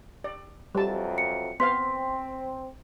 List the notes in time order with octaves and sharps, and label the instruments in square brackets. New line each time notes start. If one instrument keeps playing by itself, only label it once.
[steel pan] D5
[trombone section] F2 E3 F#3 [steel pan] G3 A5
[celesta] C#7
[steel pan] B3 C5 F5 [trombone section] C4 [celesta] C6 B6